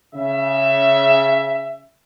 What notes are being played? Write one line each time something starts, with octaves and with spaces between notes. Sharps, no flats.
C#3 E5